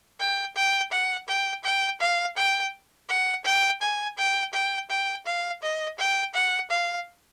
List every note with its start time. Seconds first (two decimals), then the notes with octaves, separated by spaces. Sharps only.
0.20 G5
0.56 G5
0.92 F#5
1.28 G5
1.64 G5
2.00 F5
2.37 G5
3.09 F#5
3.45 G5
3.81 G#5
4.18 G5
4.53 G5
4.90 G5
5.26 F5
5.62 D#5
5.98 G5
6.34 F#5
6.70 F5